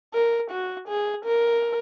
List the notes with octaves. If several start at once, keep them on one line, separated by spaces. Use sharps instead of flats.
A#4
F#4
G#4
A#4